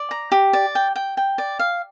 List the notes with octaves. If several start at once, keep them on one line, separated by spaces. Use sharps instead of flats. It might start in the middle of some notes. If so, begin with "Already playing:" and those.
Already playing: D5
A#5
G4
D5
G5
G5
G5
D5
F5